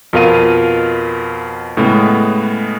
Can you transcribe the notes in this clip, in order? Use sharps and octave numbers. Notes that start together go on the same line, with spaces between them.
F2 B2 F4 A#4 F5 D#7
A2 C#3 G#3 B3